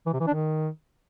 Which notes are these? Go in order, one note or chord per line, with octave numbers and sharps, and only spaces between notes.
E3
C3
E3
D4
D#3